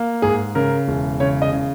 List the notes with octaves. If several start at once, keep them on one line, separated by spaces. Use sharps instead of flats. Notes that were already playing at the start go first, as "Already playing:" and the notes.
Already playing: A#3
G#2 G#4
C#3 A#4
E1
C#3 C#5
D#5
C#3